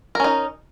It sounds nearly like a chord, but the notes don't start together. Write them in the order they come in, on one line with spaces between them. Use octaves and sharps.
A#4 C#4 D#4